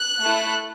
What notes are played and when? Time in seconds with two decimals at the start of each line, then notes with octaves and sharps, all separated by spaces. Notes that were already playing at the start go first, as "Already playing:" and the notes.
Already playing: F#6
0.21 A3 E4 A4